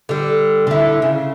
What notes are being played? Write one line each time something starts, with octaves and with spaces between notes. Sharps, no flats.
D3 G3
D3 E4
C#3